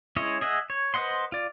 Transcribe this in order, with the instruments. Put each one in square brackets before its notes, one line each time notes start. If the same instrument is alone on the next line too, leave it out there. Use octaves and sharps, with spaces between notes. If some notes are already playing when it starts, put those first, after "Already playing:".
[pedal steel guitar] G#3 C#4 E4 C#5 D#5
G#4 D#5 E5 F#5
C#5
B4 C5 D#5 F#5 C6
F4 D5